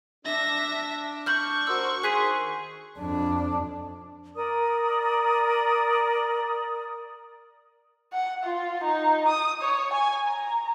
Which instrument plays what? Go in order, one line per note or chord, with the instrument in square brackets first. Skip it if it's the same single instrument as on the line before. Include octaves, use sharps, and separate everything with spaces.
[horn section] D4 [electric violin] E5 A#6
[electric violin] C#6 [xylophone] F6 G6 F#7
[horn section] F#4 A#4 C5 [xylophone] E6
[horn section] D#3 C5 C6 [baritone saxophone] G#4 [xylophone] F#6 B6 D#7
[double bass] F2 D4
[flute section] A#4 D5 D#6
[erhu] F#5
F4
D#4
D#6
C#5
G#5
A#5